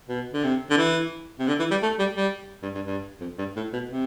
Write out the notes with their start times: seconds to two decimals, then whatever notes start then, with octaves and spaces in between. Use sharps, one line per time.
0.08 B2
0.34 D3
0.44 C3
0.70 D3
0.78 E3
1.39 C3
1.48 D3
1.59 E3
1.71 G3
1.82 A3
1.99 G3
2.17 G3
2.62 G2
2.75 G2
2.86 G2
3.21 F2
3.38 G2
3.56 A2
3.73 B2
3.90 C3